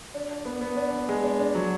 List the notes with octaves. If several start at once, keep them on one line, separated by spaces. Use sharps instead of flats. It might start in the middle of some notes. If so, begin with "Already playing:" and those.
D4
D4
B3
B3
D4
B3
G#3
D4
D4
F#3